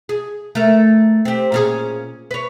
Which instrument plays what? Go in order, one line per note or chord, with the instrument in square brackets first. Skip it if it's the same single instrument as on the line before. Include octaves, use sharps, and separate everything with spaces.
[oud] G#4
A3 A#4
C4 G4
A#2 C#4 G#4
B4 C#5